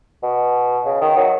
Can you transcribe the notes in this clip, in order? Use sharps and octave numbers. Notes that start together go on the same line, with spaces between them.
B2
C#3
D#3
F#3